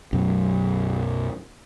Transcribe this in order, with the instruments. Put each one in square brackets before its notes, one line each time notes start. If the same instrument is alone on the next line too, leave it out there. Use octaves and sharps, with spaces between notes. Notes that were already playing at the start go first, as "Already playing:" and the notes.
[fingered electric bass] B1 F#2